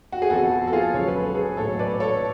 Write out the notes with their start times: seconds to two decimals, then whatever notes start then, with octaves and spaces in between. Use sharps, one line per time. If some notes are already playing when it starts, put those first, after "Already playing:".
0.12 F#4
0.22 G#4
0.30 F2 F3 B3 F#4 A4
0.67 A4
0.73 F4 G#4
0.94 C#2 C#3 F#3 C#5
1.07 B4
1.21 A4
1.35 G#4 B4
1.57 A1 A2 F#3 A4 C#5
1.79 B4 D5
2.00 A4 C#5